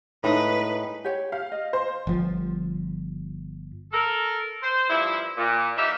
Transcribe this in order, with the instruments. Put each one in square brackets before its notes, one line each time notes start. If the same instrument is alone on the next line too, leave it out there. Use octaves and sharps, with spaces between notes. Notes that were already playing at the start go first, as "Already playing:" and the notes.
[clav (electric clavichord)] A2 [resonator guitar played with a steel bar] G#3 D#4 D#5 [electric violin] B4
[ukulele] G4 C#5 G5
[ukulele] G4 [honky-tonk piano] F5
[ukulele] D#5
[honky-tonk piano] C5
[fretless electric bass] G1 F3
[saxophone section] A4 A#4
C5
G2 F3 E4
A#2
E3 A#3 D#4 G4 E5